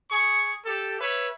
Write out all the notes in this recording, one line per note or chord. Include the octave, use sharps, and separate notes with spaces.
G#4 C#6
G4 A4
B4 C#5 E5